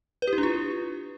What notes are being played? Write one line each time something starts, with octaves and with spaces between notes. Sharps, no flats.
B4
G4
E4
D4
F4